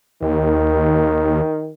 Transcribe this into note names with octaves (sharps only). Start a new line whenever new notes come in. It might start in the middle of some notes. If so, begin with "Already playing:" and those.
D#2 D#3